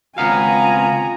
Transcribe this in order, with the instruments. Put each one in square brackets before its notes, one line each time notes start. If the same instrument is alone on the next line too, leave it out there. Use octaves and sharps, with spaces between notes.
[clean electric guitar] C#2 B3 F5 [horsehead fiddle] C4 G#5 [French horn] F4 [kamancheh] A#5